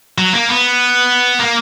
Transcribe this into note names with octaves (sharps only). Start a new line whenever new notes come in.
F#3
A#3
B3
A#3